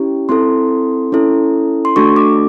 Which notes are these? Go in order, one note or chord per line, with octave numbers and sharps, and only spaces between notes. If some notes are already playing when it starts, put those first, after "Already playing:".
Already playing: C#4 E4 G4
C4 E4 A4 C6
C#4 E4 A4
C6
A3 D4 F#4 A4 C#6
D6